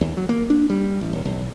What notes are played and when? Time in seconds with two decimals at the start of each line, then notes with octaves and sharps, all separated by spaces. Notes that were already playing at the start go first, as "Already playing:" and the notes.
0.01 D#2
0.17 F#3
0.29 A#3
0.50 D4
0.70 G3
1.01 A1
1.13 D#1
1.25 B1